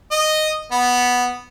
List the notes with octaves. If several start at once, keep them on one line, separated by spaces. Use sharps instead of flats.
D#5
B3